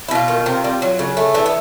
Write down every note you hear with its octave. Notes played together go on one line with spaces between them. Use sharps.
E4
B2 F4
D#3
C3
G3
F#3
C#3
A3
E3 D4
B3